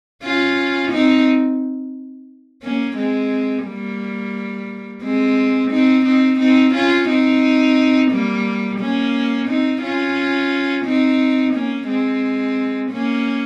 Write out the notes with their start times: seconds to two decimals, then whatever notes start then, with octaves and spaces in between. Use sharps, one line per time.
0.23 C#4 F4
0.92 C4 D#4
2.63 A#3 C#4
2.97 G#3 C4
3.65 G3 A#3
5.03 G#3 C4
5.71 C4 D#4
6.05 C4 D#4
6.40 C4 D#4
6.74 C#4 F4
7.08 C4 D#4
8.11 G3 A#3
8.79 A#3 C#4
9.48 C4 D#4
9.82 C#4 F4
10.85 C4 D#4
11.54 A#3 C#4
11.87 G#3 C4
12.91 A#3 C#4